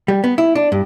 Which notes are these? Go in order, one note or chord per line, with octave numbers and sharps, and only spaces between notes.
G3
B3
E4
D4
G2